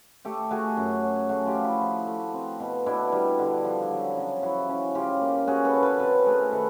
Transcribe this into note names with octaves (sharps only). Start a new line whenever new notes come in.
A3 G4 A4
A3 F#4 G#4
F#2
F#3
A3 F#4 G#4
F4 G4
F3
E4 F#4
F3
A3
C4
B2
B2 D4 E4
G3
D3
F3
F#3
C#3
F3 E4 F#4
C#4
C#3 F4 G4
A#3
C#4 F#4 G#4
A4 B4
C#4
A4 B4
C3 A4 B4
A3 G#4 A#4
D#3 A4 B4